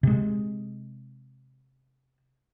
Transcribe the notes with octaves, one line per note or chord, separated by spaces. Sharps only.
C3 G#3